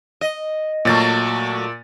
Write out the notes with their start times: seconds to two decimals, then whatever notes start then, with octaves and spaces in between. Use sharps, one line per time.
0.21 D#5
0.85 A#2 F#3 A3 A6